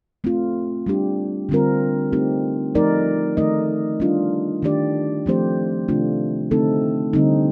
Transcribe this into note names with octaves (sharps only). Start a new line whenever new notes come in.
A3 C4 F4
G3 D4 G4
D3 G3 C4 F4 A#4
A3 C4 D#4 G4
F3 A3 D#4 A#4 D5
D#3 A3 D#4 A#4 D#5
G3 D4 F4
D#3 A3 D4 G4 D5
F3 A3 C4 G4 C5
C3 D#3 A3 D4 F4
D3 A3 C4 D#4 A4
D3 G3 C4 D#4